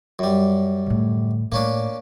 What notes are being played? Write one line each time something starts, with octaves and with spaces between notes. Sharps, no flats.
F#2 G3
A2 D3
A2 A#3 C#4 D4